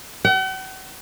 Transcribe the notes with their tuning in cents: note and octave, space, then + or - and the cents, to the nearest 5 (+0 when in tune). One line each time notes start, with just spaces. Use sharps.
F#5 +45